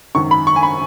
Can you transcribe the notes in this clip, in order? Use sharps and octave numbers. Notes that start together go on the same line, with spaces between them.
G#1 F#2 D#3 C#6
B5
C#6
G#5
B5